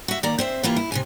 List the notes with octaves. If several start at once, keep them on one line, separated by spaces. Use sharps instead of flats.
F#4 E5
D#3 A#3 D5 A#5
C4 C5 E5
E3 G3 A#3 E4 F4 G4
E4
C3 F3 G#5